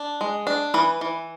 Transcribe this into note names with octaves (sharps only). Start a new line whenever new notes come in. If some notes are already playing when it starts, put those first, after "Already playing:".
Already playing: D4
G#3
D4
E3 B4
E3